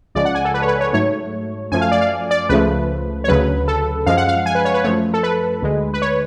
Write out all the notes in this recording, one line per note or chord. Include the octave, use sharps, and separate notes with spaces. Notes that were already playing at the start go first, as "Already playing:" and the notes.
C#2 C#3 F3 G#3 D5
F#5
G#5
A4
B4
C#5
B4
C#5
G#2 F#3 A3 C#5
F#2 F3 A3 G#5
F5
D5
F5
D5
C#2 C#3 F3 A3 B4
C#5
D2 C#3 F#3 B4
A4
F#2 F3 G#3 F5
F#5
F5
G#5
B4
C#5
B4
F#2 F3 A3 C#5
A4
B4
D2 D3 G#3
B4
C#5